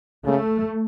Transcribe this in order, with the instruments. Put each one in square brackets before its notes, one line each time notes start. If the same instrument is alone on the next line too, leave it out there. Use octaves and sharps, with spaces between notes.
[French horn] C#3 [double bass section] A3